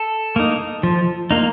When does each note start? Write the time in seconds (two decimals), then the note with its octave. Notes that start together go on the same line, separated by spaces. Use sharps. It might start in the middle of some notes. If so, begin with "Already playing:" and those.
Already playing: A4
0.36 A#3 D#4
0.83 F3
1.31 A#3 D#4